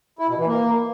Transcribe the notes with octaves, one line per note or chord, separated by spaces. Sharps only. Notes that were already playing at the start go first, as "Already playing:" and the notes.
E4
B2
E3
A#3